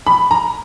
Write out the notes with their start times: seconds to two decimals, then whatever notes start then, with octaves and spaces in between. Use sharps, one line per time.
0.07 B5
0.31 A#5